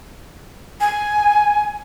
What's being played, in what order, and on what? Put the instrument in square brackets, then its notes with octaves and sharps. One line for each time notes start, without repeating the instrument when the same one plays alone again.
[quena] G#5